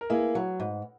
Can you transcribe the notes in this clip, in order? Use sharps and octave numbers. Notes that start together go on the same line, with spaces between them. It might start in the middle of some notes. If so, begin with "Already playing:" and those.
A#4
A#3 E4 G#4
F#3
G#2